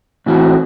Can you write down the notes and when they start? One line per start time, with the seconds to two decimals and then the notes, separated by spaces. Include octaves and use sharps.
0.26 A2 E3 C4 F#4